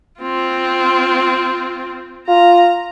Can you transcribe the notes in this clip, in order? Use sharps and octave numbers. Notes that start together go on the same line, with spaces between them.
C4 F4
F4 A#5